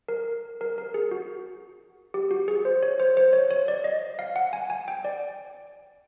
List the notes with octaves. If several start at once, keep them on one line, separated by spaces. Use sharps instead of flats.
A#4
A#4
A#4
G#4
F#4
G4
F#4
G#4
C5
C#5
C5
C5
C#5
C#5
D5
D#5
F5
F#5
G#5
G#5
G5
D5